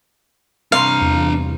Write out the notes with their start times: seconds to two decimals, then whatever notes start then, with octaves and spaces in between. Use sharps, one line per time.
0.72 G2 C3 D4 F5 A#5 C6
1.02 E2